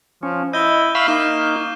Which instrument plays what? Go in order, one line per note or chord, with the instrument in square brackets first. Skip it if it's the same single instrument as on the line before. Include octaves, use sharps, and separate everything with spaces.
[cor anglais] F3 [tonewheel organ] C#4
[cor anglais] E4 [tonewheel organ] D#5 [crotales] G6 G7
[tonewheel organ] E5 F5 B5 [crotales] C#6 F6 C7
[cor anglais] A#3 [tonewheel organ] D#4 [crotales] E7